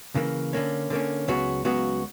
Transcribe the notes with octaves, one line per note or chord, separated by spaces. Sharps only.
C#3 E3 A#3
D3 A#3 C#4
D3 A#3 C#4
C#2 C#3 F#3 B3 F#4
C#2 C#3 F#3 B3 F#4